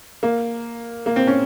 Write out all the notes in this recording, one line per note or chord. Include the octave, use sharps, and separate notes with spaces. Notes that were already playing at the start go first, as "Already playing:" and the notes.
A#3
A#3
C4
C#4